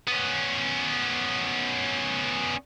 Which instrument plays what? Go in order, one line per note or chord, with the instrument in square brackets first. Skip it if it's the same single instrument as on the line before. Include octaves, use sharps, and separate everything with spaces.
[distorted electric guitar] B3 C#4